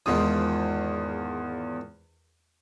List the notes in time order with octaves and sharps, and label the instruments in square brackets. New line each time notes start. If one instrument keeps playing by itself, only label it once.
[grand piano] E2 F4 D#6 [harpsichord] G#2 D#3 F3